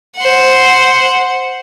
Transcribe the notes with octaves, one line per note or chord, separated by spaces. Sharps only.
C5 F#5